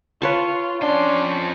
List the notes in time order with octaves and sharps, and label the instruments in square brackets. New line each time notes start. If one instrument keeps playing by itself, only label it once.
[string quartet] F4 [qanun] B4 C#5 A5
[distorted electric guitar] F2 C6 [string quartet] C#4 [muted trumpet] D4